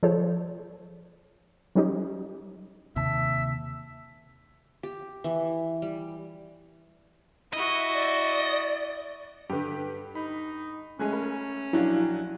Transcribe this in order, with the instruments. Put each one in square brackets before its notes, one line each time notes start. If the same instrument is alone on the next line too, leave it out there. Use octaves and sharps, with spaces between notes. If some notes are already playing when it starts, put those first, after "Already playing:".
[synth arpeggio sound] F3 G#4 A4 C5 C#5
F#3 G3 C#4 D#4 G4
[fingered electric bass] D#2 [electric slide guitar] C3 A5 [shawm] E5
[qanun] G4
E3
G3
[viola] E4 F#4 [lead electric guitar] D#5
[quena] D5
[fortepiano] G2 D3 [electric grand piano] G4 B4
[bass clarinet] D#4 [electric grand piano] B5
[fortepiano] G#3 G#5 F#6 [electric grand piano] A3 [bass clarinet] C#4
[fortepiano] A#4 G#5 B5
[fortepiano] A#1 F5 [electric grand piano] F#3 D4 G4 [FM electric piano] E4